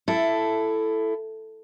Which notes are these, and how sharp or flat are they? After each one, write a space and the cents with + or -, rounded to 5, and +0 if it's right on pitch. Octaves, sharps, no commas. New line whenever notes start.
E4 +15 A4 +0